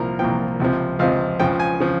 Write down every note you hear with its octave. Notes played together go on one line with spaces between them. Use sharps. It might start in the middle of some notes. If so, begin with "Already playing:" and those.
Already playing: C2 A#2 F3 A#4
C2 A#2 F3 G5
C#2 C3 F3
C#2 C3 F3 F5
C#2 C#3 F3 G5
G#5
C#3 F3